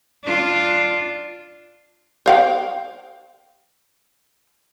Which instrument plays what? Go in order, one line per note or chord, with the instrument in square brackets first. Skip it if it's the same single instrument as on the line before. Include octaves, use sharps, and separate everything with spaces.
[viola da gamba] D4 F4
[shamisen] C5 F5 G5